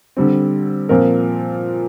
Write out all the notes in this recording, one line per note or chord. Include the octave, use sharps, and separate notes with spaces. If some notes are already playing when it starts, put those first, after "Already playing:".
D3 G3 C4
A#2 F3 C4 A#4